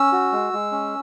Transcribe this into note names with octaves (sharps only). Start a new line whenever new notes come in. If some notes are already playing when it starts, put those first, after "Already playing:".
Already playing: C#4 E6
F#4
G#3
G#3
C#4